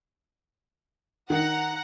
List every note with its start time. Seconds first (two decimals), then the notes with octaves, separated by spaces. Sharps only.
1.30 D#3 F#5 A#5